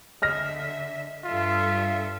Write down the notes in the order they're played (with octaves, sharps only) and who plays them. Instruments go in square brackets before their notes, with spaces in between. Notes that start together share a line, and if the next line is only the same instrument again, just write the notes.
[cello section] D3 E5 [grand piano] D#5 F6 A#6
[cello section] G2 A4 E5 [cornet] F4